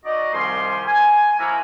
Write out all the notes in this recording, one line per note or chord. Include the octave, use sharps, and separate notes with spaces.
D#4 F#4 D5 D#5
C2 D#3 F3 G3 G#5 C6
G#5
F3 A#3 E4 F#4